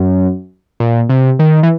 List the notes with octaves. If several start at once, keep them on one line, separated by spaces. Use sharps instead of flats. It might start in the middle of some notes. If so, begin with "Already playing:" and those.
Already playing: F#2
A#2
C3
D#3
E3